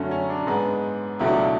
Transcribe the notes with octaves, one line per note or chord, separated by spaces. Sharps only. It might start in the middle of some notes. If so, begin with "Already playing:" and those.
Already playing: F#2 D3 F#3 A3 C#4
C#4
D4
G#2 G#3 B3
C#2 B2 F#3 A3 E4
D4
E4